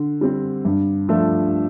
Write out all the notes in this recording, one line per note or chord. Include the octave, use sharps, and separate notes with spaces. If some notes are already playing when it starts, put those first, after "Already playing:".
Already playing: D3
G3 C4 G4
G2
F3 A3 D4 A4